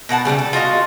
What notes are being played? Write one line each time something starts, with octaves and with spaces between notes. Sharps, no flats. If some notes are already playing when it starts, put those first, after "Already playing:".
B2 A#4 F#5 A5
C#3 G3 B3 D4
A4
F4 F#4 D#5 F5